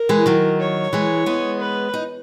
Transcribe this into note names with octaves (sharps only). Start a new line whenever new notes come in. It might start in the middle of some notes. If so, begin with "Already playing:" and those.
Already playing: A#4
E3 G#3
D#3 F#3
C#5
E3 G#3
G#3 B3
B4
D#4